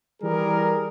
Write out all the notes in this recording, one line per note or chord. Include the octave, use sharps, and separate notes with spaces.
E3 G3 G#4 A#4